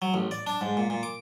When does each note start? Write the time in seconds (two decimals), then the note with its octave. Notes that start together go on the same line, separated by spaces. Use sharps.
0.02 F#3
0.14 A1
0.31 D5
0.47 D4
0.61 G#2
0.77 A#2
0.90 A#2
1.03 D6